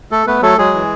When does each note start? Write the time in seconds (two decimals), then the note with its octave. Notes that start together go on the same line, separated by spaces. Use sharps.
0.11 A3 A4
0.27 A3 B3 B4
0.42 F#3 A3 A4
0.58 F#3 G#3 G#4
0.74 E3